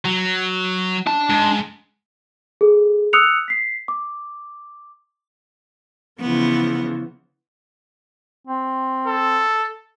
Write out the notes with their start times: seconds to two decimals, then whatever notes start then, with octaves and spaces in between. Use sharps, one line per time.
0.05 F#3
1.07 D4 A5
1.30 G#2
2.61 G#4 A4
3.13 D#6 E6 F#6 C#7 F7
3.48 B6 C7
3.88 D6
6.20 C#3 E3 F3 B3
8.47 C4
9.07 A4